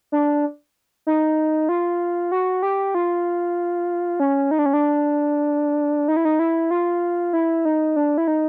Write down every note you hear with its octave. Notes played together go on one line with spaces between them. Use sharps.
D4
D#4
F4
F#4
G4
F4
C#4
D#4
D4
C#4
D4
D#4
E4
D#4
E4
F4
E4
D#4
D4
E4
D#4